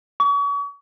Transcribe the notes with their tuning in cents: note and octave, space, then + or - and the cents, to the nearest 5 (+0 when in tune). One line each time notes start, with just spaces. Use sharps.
C#6 +40